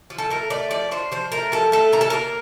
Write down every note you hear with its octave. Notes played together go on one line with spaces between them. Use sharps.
F3
A4
A3 A#4
A3 D5
F3 D5
D4 C5
F3 C5
A3 A#4
F3 A4
A3 A4
A#3 A#4
A4
A#3 A#4